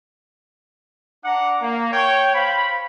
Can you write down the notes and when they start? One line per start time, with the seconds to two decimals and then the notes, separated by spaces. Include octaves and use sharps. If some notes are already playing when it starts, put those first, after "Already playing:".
1.23 D4 F#5 A#5 D6
1.62 A#3
1.92 C#5 G5
2.33 C5 F5 B5